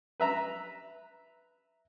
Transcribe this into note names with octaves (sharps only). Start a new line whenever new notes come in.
B4 E5 A#5